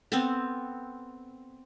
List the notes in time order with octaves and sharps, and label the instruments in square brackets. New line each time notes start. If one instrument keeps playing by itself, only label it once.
[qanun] B3 C4 A4